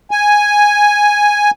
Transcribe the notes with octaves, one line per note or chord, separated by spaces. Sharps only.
G#5